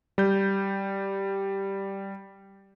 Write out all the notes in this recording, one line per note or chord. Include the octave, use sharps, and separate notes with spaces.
G3 G6